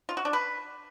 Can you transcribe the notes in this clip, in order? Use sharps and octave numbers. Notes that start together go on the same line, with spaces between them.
F4
F#4
D4
B4